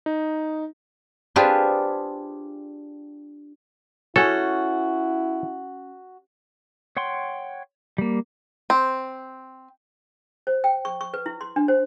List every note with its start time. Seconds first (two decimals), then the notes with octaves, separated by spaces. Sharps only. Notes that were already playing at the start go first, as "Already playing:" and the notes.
0.06 D#4
1.36 D4 F4 G4 G#4 B4 C5
4.16 C#4 E4 F#4 A4
6.97 C#5 F#5 G5 C6
7.98 G3 A#3
8.70 C4
10.47 C5
10.64 G5
10.85 C#6
11.01 C#6
11.14 B4
11.26 E4
11.41 C6
11.56 D4
11.68 C5